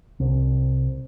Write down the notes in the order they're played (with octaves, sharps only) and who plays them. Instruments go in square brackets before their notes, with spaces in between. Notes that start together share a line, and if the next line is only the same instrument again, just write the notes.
[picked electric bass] C2